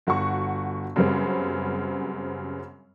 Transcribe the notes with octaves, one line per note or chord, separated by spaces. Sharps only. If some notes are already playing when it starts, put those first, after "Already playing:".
G1 F#4 F#5 C#6
F#2 C#3 G3 B3 C4